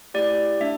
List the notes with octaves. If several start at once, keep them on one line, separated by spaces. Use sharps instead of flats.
A3 E4 G4 D5
A3 D4 E5